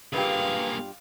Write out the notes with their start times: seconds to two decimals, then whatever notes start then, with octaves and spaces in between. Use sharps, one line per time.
0.13 G2 A#3 F4 G4 G#4 B4 F5